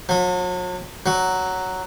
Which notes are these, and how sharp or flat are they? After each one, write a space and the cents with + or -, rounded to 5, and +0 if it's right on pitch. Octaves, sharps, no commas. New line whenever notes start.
F#3 -40
F#3 +5